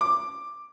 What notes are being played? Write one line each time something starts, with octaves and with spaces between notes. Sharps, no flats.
D6